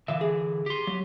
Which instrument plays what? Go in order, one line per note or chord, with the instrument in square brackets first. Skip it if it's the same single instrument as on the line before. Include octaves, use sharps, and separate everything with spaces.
[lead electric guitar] D3 E3 [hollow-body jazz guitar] E5 F5
[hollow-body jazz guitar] G#4
[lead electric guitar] G4 C6
[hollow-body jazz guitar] F#3